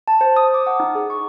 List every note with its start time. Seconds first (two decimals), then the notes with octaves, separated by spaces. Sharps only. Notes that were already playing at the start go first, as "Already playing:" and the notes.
0.08 A5
0.21 C5
0.37 D#6
0.54 D6
0.67 F#5
0.80 D#4
0.95 G#4
1.10 C#6